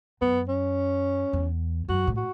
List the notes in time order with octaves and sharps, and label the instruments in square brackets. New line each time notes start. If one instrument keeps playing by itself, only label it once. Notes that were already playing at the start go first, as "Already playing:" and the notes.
[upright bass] F#2 [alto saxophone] B3
[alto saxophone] C#4
[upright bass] E2
[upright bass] F#2 [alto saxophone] F#4
[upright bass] A2
[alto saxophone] F#4